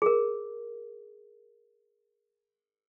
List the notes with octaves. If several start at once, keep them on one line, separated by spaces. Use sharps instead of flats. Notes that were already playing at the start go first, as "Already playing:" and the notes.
G#4 A#4